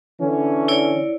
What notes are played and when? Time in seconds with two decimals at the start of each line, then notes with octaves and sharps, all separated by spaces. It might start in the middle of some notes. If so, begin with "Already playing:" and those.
0.20 D3 E3 C#4
0.68 E4 C#5 D5